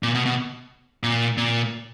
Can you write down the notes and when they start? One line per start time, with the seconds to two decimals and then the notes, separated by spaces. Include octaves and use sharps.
0.03 A#2
0.14 B2
0.26 B2
1.03 A#2
1.37 A#2